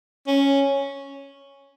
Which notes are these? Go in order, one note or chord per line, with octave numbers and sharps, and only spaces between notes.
C#4